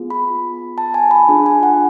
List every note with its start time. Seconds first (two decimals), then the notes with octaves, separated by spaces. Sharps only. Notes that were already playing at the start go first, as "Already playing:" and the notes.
Already playing: B3 F4 G#4
0.10 B5
0.78 A5
0.94 G#5
1.11 B5
1.29 D4 F4 G#4
1.46 G#5
1.63 F#5